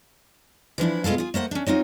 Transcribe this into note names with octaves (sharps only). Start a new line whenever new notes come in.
E3 F3 D4 E4
B2 G#3 F4 A4 F5
F4 G#4
A3 A#3 C5 F#5
C#4 D4
F#3 C4 D#4 F4